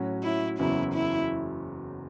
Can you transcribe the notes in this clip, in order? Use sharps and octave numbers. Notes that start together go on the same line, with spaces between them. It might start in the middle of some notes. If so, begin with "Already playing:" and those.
Already playing: A2 F#3 C#4 F#4
E4
F#1 E2 C#3 F#3 E4
E4